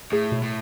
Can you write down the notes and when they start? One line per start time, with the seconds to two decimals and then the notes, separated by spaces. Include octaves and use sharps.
0.12 A2 G#4
0.32 B2
0.43 A2